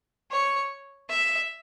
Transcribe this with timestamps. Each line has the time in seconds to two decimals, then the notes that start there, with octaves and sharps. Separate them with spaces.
0.31 C#5
1.09 E5